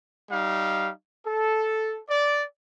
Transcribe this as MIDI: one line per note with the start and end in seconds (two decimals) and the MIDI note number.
0.30 0.92 55
0.30 0.92 63
0.30 0.92 77
1.26 2.01 69
2.10 2.43 74